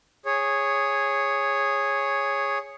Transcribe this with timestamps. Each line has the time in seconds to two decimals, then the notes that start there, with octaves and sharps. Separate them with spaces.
0.26 G#4 C#5